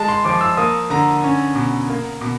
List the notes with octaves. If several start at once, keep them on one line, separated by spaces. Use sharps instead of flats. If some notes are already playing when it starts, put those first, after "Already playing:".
Already playing: G#3 A5
C6
F3 D6
E6
A#3 D#6
D3 A#5
C#4
B2
A#3
B2